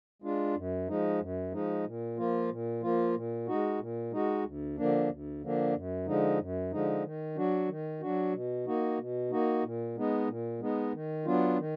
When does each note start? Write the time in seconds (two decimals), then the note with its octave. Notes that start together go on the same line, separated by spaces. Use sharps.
0.22 G#3 D4 F4
0.56 F#2
0.88 F3 G#3 D#4
1.20 F#2
1.52 F3 G#3 D#4
1.86 A#2
2.18 F3 A#3 F4
2.49 A#2
2.82 F3 A#3 F4
3.15 A#2
3.47 G#3 D#4 F#4
3.79 A#2
4.12 G#3 D#4 F#4
4.44 D2
4.77 D3 F3 A#3 D4
5.10 D2
5.42 D3 F3 A#3 D4
5.74 F#2
6.06 D3 F3 G#3 D#4
6.39 F#2
6.72 D3 F3 G#3 D#4
7.04 D#3
7.36 F#3 D4 F#4
7.69 D#3
8.01 F#3 D4 F#4
8.33 B2
8.66 A#3 D#4 F#4
8.99 B2
9.31 A#3 D#4 F#4
9.64 A#2
9.96 G#3 B3 D#4
10.28 A#2
10.60 G#3 B3 D#4
10.93 D#3
11.25 F#3 B3 D4 F4
11.58 D#3